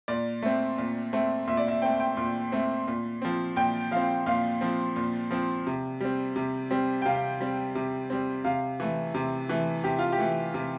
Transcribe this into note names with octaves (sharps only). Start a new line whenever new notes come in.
A#2 D5
A3 C4
A#2
A3 C4
A#2 E5
D5
E5
A3 C4 G5
G5
A#2
A3 C4
A#2
F3 C4
A#2 G5
F3 C4 F5
A#2 F5
F3 C4
A#2
F3 C4
C3
G3 C4
C3
G3 C4
G5
C3 F5
G3 C4
C3
G3 C4
C3 F5
E3 A3
C3
E3 A3
C3 G4
F4
G4
E3 A3
C3